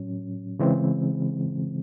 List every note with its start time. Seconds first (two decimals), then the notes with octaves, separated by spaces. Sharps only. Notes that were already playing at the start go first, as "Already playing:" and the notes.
Already playing: A2 F#3 C#4
0.59 C#3 E3 G#3 C4